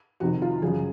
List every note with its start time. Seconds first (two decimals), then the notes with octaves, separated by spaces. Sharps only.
0.20 F2 C3 D#3 F#4
0.42 F4
0.62 F#2 C#3 F3 G#4